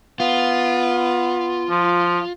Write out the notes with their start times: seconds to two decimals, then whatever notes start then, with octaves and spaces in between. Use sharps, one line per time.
0.20 B3 F4
1.70 F3